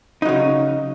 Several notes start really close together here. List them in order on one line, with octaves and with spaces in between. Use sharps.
D#4 F#3 C#3